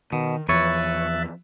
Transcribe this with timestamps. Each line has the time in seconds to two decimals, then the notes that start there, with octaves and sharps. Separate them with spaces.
0.13 B2 D#3
0.49 E2 F3 B4 C#5 E5 F#6 A6